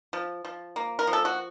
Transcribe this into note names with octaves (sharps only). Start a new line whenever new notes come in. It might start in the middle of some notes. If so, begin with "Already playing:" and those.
F3
F3
A#3
A#4
F3
A4
F#4